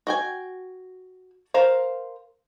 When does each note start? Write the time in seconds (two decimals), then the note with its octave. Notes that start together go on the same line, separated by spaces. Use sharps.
0.07 F#4 G5 G#5
1.54 A#4 C5 F5